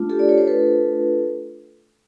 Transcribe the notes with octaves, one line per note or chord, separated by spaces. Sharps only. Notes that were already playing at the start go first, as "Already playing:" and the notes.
Already playing: A3 D4 F4
G4 A4
D5
C#5
C5
A4 B4